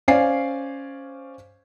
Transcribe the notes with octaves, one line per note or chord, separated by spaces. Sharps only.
C#4 C5 D5 F5 G#5 C7